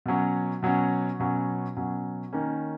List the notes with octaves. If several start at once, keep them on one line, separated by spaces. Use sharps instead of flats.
B2 F#3 C#4
B2 F#3 C#4
B2 F#3 C#4
B2 F#3 C#4
D#3 A#3 C#4